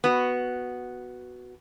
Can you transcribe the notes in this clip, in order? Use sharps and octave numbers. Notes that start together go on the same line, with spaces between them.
B3 F#4